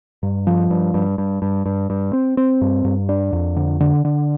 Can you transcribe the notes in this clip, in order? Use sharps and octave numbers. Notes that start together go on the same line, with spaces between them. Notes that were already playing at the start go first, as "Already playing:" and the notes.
G2
F3
G2
G2
G2
G2
G2
G2
C4
C4
G2
G2
D4
F2
D3
D3
D3